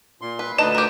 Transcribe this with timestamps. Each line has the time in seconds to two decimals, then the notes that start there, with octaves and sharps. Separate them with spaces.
0.21 A#2 C6
0.39 B4
0.58 D2 D4 D#4 B4 D#5 E7
0.75 G4 A#4